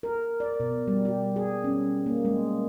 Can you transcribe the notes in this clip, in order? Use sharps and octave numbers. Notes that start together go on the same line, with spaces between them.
A#4
D5
B2
G3
G4
G#4
C#4
A#3
G#3